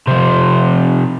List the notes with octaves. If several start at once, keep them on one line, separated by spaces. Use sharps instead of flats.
C3 F3